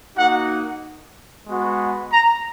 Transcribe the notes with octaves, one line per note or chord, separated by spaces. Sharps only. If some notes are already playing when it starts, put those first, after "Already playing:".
A#3 D#4 F#4 F#5
G#3 B3 F#4
A#5